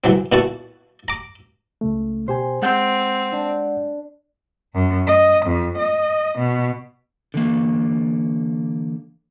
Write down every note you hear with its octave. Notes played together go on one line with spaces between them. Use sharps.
C2 E3 F#3 C4
A#2 B3 E4 F#4 A5 C#6
A#5 D6
C#2 C#3 A3
B2 G4 C5 G#5
G#3 C4 F#5 G6
D4
F#2
D#5
F2
D#5
B2
D3 E3 A#3